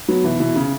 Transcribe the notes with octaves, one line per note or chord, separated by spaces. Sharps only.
F#3 B3
B2 E3
B2 E3
C#3